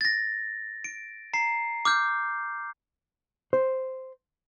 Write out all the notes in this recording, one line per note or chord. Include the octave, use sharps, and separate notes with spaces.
A6 A#6
D7
A#5 C7
D6 F6 G6
C5